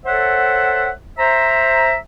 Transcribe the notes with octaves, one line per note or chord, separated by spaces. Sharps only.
A4 C5 C#5 E5 F#5
C5 E5 A#5